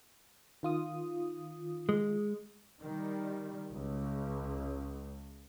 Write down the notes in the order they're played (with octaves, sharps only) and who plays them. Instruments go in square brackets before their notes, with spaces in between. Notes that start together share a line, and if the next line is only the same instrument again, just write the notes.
[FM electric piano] D#3 F4 D#6
[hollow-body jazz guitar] G#3
[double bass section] D#3 G3
C#2